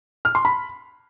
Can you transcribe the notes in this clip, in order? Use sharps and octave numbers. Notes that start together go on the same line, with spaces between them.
F6
C6
B5